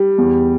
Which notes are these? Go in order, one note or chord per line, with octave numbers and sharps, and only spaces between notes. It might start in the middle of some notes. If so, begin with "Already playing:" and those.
Already playing: G3
E2